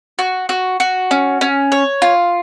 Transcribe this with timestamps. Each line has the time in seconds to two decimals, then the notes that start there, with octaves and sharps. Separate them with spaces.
0.19 F#4
0.49 F#4
0.80 F#4
1.11 C#4
1.41 C#4
1.72 C#5
2.02 F4